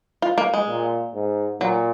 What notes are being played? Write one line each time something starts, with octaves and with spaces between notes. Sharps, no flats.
F4
A#3
G#3
A#2
G#2
A#2 F#3